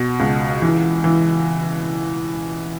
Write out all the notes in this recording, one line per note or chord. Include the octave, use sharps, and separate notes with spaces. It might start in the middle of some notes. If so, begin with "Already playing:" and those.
Already playing: B2
C#2
E3
E3